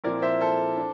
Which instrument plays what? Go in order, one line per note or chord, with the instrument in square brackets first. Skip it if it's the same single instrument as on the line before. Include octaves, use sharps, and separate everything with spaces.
[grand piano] A#2 F3 C4 E4 A#4 D5
C5 E5
A4 C5
D4